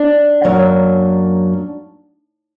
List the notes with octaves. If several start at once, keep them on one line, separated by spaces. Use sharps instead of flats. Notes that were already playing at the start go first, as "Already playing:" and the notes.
Already playing: D4
F#2 F#3 A#3